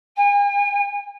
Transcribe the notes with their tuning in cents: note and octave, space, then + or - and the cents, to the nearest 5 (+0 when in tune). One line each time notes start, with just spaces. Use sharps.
G#5 -40